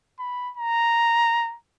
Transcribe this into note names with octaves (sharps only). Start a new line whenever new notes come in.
B5
A#5